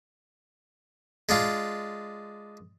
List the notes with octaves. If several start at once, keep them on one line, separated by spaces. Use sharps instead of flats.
G#3 D4 F4